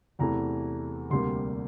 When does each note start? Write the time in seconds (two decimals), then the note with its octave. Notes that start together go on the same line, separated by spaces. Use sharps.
0.19 E2 C3 E3 A3 A#5
1.10 D2 C3 G3 A#3 C6